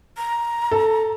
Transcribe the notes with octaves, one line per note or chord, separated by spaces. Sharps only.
A#5
A4